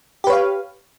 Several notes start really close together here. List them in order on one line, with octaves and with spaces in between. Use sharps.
G4 B4 C#5 F5